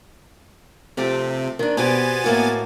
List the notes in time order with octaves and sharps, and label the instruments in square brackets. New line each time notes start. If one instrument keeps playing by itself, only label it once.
[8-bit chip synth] C3 [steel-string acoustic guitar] F3 A3 G4
[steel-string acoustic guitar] D#3 D4
[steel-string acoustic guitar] B2 C4 G4 [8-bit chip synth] B3 G#5 A6
[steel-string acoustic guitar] A2 A#3 F#4